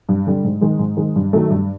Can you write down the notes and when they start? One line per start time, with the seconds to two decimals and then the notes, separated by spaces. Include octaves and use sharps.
0.09 G2
0.27 D3 G3
0.44 G#2
0.61 D#3 G#3
0.79 G#2
0.97 D#3 G#3
1.16 G2
1.33 D#3 F#3 A3
1.50 G2